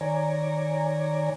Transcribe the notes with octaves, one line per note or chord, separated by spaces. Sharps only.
D#3 C#5 D5 G#5 A#5